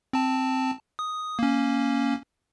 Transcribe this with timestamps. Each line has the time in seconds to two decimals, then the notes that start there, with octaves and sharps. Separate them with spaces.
0.13 C4 A5
0.99 D#6
1.39 A#3 C#4